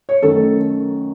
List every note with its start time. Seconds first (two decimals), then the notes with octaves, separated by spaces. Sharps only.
0.09 C#5
0.22 F#2 D#3 A3 A4